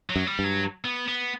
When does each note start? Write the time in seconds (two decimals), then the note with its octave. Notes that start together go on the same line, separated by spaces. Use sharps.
0.10 F#3
0.16 F#2
0.27 G3
0.39 G2
0.44 F#3
0.85 B3
1.08 B3